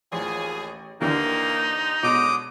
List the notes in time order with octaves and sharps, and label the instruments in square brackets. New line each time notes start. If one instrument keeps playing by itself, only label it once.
[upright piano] A1 [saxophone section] D#2 F3 G#4
[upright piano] D#2 D3 E3 [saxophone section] A#3 [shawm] D#4
[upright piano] B2 [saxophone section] D3 F#3 G#3 [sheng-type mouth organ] D6 D#6